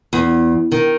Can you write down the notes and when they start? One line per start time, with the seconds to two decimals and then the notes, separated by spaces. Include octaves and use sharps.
0.13 E2
0.72 D#3